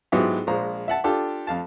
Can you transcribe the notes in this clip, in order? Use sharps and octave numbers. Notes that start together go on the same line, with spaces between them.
G#2 F#3 B3 E4 F4 G4
A#1 G#3 C5 A#5
E5 F#5 A5
D4 F4 G4 A4
F2 F5 A5